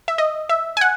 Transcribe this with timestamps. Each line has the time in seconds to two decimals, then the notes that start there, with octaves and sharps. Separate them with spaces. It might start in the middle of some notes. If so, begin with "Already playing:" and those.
0.08 E5
0.18 D#5
0.49 E5
0.77 G#5
0.81 F#5